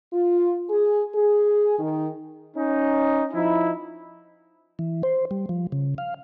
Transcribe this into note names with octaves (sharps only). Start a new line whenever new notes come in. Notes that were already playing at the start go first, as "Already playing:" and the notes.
F4
G#4
G#4
D#3
C#4 D#4
F3 D#4 E4
E3
C5
G3
F3
C#3
F5